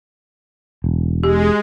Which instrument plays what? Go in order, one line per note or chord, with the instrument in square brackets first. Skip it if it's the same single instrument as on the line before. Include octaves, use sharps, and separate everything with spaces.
[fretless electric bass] E1
[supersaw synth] G#3 [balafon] G4